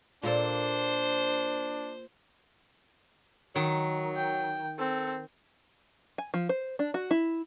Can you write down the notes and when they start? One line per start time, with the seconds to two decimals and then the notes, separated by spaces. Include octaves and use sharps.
0.23 A#2 A#3 D4 A4 C5
3.56 D#3 F#3
4.16 G5
4.79 C4 A4
6.18 G#5
6.34 F3
6.49 C5
6.79 D4
6.94 F#4
7.11 E4